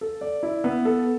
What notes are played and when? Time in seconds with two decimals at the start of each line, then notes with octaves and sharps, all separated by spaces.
0.01 A4
0.21 D5
0.43 E4
0.64 B3
0.85 A4